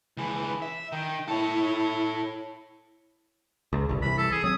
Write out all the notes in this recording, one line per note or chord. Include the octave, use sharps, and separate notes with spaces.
C#2 E3
E5
D#3 G5
E4 A4 C#5
C#2
G1 C2
C2 E3 B5
A4
G#4
F#3 C4 D#6